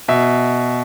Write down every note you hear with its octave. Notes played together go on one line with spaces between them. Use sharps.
B2 E5